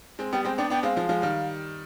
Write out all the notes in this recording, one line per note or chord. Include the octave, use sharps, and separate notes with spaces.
G#3 C4
G3 B3 G5
G#3 C4 G5
B3 D4 G5
B3 D4 G5
G#3 C4 F5
F3 G#3
F3 G#3
D#3 G3